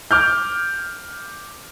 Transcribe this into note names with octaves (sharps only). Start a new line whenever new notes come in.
D6 F6 G6